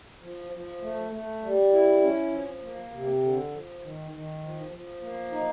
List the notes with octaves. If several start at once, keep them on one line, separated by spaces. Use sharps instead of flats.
F3
F3
A3
A3
G3
E4
C#4
F3
A#3
C3
D3
F3
D#3
D#3
F3
F3
A#3
D#4